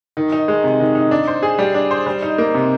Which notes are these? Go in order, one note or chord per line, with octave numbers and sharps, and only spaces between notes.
D#3
D#4
G#3
C3
D#3
D#4
D4
C5
G#4
G3
D4
C5
G3
D#4
A#3
C3